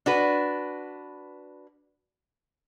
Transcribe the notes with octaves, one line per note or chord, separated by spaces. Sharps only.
D4 F#4 B4